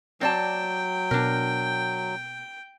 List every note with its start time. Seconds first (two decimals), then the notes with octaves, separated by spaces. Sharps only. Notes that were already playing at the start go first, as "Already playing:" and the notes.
0.21 F#3 C4 D5 G5 A5
1.11 B2 D4 A#4